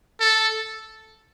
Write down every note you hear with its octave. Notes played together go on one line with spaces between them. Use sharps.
A4